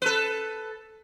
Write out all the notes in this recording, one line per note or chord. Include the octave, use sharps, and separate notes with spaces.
A4 B4